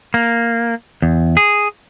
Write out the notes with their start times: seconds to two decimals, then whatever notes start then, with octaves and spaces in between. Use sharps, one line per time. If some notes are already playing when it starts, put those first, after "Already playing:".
0.14 A#3
1.02 E2
1.37 G#4